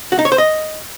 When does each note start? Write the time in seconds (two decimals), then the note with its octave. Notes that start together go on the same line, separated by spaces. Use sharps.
0.12 F#4
0.19 D#4
0.25 C#5
0.32 C5
0.38 D#5